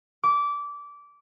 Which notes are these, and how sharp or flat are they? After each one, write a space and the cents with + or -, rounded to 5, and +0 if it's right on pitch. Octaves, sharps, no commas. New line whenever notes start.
D6 -20